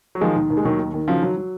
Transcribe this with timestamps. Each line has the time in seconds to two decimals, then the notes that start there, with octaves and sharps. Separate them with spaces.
0.15 F#3
0.21 D#3 F3 G#3
0.36 D#2
0.50 D#2
0.57 G#3
0.65 D#2 D#3 F#3
0.79 D#3
0.94 D#3
1.07 C#3 F3 F#3
1.23 F#3
1.37 F#3